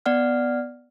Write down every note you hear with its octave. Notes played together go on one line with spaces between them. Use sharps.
B3 D5 F#5 F6